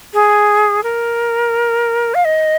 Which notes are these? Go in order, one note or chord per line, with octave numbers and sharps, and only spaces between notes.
G#4
A#4
F5
D#5